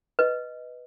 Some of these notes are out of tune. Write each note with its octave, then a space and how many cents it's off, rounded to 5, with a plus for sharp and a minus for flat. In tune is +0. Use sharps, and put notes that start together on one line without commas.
B4 +0 D#5 +0